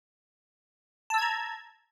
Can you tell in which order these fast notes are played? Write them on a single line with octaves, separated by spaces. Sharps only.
A5 E6 G#6 A#5